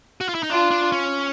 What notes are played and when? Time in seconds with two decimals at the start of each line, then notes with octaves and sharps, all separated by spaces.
0.21 F#4
0.29 F4
0.35 E4
0.43 D#4
0.50 D4 F4
0.71 D4
0.92 C#4